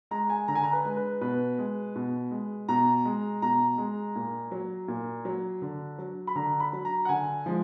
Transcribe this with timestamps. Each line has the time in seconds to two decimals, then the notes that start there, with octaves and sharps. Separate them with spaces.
0.11 G#3 A#5
0.30 G#5
0.48 D3 A#5
0.55 G#5
0.64 A#5
0.73 B4
0.85 G#3
0.96 B4
1.21 B2 B4
1.58 G#3
1.96 B2
2.31 G#3
2.68 B2 A#5
3.05 G#3
3.42 B2 A#5
3.78 G#3
4.16 A#2
4.51 F#3
4.88 A#2
5.25 F#3
5.62 D3
5.98 F#3
6.27 B5
6.36 D3 A#5
6.60 B5
6.73 F#3
6.85 A#5
7.05 F#5
7.09 D3 G#5
7.46 F3 G#3